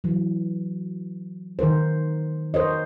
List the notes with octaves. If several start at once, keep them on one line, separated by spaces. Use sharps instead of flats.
E3 F#3
D#3 D#4 A#4 C5
A#4 C5 C#5 D#5